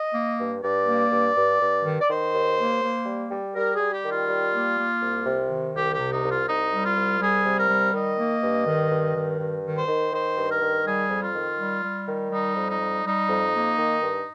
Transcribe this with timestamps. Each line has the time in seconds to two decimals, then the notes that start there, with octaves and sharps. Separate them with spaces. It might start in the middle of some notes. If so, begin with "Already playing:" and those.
Already playing: D#5
0.14 A#3
0.39 G2
0.63 G2 D5
0.87 A#3
1.11 G2
1.36 G2
1.60 G2
1.85 D#3
2.01 D5
2.09 D#3 C5
2.33 D#2
2.58 A#3
2.82 A#3
3.06 G3
3.31 G3
3.55 G3 A#4
3.74 G#4
3.79 G3
3.91 G4
4.04 D#3
4.10 F4
4.28 G3
4.53 A#3
4.77 A#3
5.01 C2
5.26 C3
5.50 D#3
5.75 C2 G4
5.92 G4
5.99 C3
6.11 D#4
6.23 C2
6.30 F4
6.47 C2 D#4
6.72 G3
6.84 F4
6.96 C2
7.20 G3 G#4
7.45 C3
7.57 A#4
7.69 G3
7.93 D#3 D#5
8.18 A#3
8.42 G2
8.66 D#3
8.90 G2
9.15 D#3
9.39 G2
9.64 D#3
9.76 C5
9.88 D#3
10.13 D#3 C5
10.37 G2
10.49 A#4
10.62 D#3
10.86 G3 G#4
11.09 F2
11.22 F4
11.34 D#3
11.59 G3
11.83 G3
12.07 D#3
12.31 G3 D#4
12.56 F2
12.68 D#4
12.80 G3
13.05 G3 D#4
13.29 F2
13.53 A#3
13.78 D#3
14.02 G2